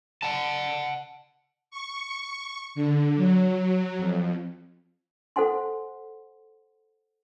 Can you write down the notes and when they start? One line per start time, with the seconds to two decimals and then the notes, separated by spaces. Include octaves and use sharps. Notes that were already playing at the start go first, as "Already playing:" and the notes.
0.22 F#5 A5
1.71 C#6
2.75 D3
3.17 F#3
3.98 F2
5.36 A4 C5 F#5 G#5 C6